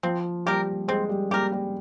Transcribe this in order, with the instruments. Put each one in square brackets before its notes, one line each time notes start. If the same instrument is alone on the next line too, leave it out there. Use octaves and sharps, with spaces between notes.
[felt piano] F3 [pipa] C4
[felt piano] G3 [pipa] G4 A#4
[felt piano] G#3 [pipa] C4
[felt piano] G3
[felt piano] G3 [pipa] G4 A#4
[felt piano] G3